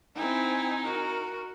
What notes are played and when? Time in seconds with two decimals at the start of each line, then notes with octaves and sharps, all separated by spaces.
0.16 C4 D#4 E4 G#5
0.84 F#4 A#4